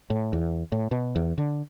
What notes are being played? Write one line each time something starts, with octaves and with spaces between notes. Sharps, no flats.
A2
E2
A2
B2
E2
D3